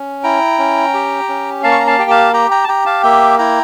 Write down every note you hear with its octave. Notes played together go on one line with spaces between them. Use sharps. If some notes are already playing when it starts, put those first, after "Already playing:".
Already playing: C#4
E4 G5 A#5
C#4
G4
C#4
A#3 F5 A5
C#6
A#5
F5 A5
G4 G5
F5 A5
G4 G5 A#5
G5 A#5
A5
G4 G5 A#5
F5 A5
A#3 E5 G5
E4 G5 A#5